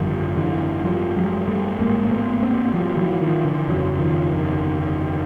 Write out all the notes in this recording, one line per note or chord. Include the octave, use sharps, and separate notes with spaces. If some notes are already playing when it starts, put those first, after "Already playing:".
Already playing: G#1 F#2 D3 F3 G3
D3 E3
F3 G3
F#3 G#3
G3 A3
A1 G#2 G#3 A#3
A3 B3
A#3 C4
F3 G3
E3 F#3
D#3 F3
D3 E3
G1 F2 C#3 E3 F#3
D#3 F3
D#3